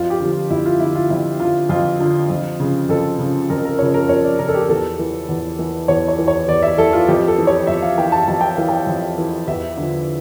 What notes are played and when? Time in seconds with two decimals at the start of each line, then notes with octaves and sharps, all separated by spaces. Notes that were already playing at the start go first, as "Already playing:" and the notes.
Already playing: F2 F4
0.10 G4
0.20 D3 F3
0.30 F4
0.50 F2 E4
0.65 F4
0.80 D3 F3 E4
0.95 F4
1.10 F2 E4
1.40 D3 F3 F4
1.69 F2 F4
1.99 D3 F3
2.30 F2
2.60 C#3 F3
2.89 F2 A4
3.19 C#3 F3
3.50 F2 A#4
3.65 A#4
3.79 C#3 F3 C#5
3.94 A#4
4.09 F2 C#5
4.24 D5
4.38 C#3 F3 A#4
4.49 A4
4.54 G4
4.68 E2 A4
4.99 E3
5.28 E2
5.59 E3
5.88 E2 C#5
6.08 C#5
6.18 E3
6.28 C#5
6.48 E2 D5
6.63 E5
6.78 E3 A4
6.93 F4
7.08 F2 G4
7.28 A4
7.38 E3
7.47 C#5
7.67 F2 E5
7.82 F5
7.98 E3 G5
8.12 A5
8.28 F2 A5
8.41 G5
8.55 E3 F5
8.69 G5
8.87 F2
9.18 E3
9.47 E2 E5
9.77 D3 F3